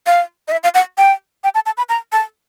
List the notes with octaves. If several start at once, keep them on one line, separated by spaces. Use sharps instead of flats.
F5
D#5
E5
F5
F#5
G5
G5
A5
A5
B5
A#5
A5